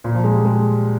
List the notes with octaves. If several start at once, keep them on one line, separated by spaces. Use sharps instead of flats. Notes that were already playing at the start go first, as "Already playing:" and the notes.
A#2
F3
G#3
G3
G#3